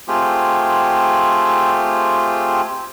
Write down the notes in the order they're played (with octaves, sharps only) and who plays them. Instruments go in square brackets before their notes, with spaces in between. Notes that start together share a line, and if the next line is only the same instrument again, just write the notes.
[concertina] A3 C4 F4 G4 G#4